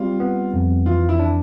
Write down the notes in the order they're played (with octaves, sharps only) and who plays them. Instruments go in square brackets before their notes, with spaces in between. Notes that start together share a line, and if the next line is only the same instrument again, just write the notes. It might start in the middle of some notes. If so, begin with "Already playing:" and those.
Already playing: [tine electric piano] G3 C4 [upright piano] F4
[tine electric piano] B3
F2
[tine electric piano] E3 [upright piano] F4
[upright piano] E4
[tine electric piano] D4